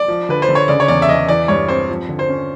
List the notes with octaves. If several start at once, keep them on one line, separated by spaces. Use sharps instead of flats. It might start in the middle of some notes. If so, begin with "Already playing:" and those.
Already playing: D5
F3
D3 B4
C5
D3
C#5
C#3 D5
C#5
E2 D5
E5
E2 D#5
E3 D5
G2 C#5
C4 C5
F3
D3
C5
C#4